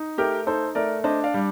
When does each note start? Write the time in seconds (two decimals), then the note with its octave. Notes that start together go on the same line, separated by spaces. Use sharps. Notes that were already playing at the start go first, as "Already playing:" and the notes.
Already playing: D#4
0.18 A3 G4 A#4
0.47 D#4 A4 C5
0.75 A3 A#4 D5
1.04 D4 C5 D#5
1.24 D5 F5
1.34 G3